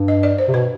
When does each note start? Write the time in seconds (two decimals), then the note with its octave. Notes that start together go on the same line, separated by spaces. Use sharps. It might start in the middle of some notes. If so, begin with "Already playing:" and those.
Already playing: G2
0.08 D#5
0.23 D5
0.38 C5
0.48 C3
0.54 B2 B4